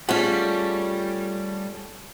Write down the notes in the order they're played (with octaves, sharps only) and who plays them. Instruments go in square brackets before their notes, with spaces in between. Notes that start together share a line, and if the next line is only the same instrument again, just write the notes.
[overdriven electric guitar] G3 [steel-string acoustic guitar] A3 C#4 [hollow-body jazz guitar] F4 G#4 F#5